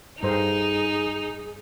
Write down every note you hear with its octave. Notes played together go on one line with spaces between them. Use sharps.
G2 D#4 G#4 A4 C5 A#5